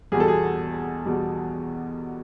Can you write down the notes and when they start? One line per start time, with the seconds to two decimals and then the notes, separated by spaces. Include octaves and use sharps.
0.12 E2 B2 G3 G#4
0.20 A4
0.28 G#4
1.06 E2 B2 G3